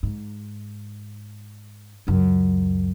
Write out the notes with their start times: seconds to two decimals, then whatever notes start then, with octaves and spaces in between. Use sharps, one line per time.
0.03 G#2
2.07 C#2 F#2